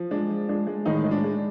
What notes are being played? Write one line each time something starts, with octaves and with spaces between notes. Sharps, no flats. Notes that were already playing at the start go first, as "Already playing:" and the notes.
Already playing: F3
G#3 D4
F3
G#3 D4
G#3
A2 D#3 D#4
G#3
D4
G#3